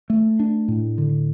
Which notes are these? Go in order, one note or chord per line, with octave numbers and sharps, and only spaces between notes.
A3
D4
A2
D3